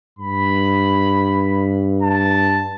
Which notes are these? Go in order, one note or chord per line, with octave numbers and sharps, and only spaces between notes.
G2 B5
A5